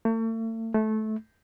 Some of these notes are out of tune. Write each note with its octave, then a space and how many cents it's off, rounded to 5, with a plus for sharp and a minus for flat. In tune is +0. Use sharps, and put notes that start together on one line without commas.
A3 +40
A3 -20